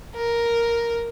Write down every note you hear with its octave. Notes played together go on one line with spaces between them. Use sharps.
A#4